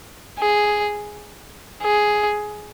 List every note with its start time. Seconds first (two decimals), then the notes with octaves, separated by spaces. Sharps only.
0.40 G#4
1.83 G#4